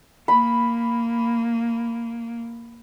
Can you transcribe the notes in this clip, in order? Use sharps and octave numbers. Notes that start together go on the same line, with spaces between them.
A#3 B5